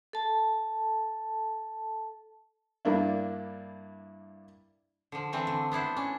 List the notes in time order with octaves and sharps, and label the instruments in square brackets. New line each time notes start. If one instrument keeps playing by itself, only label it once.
[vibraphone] A4 A5
[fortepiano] G2 A#3 D4 E4
[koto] D3 F3
E3 A3 C4 D4
D3
B3 D4 E4 C5
C#4 D4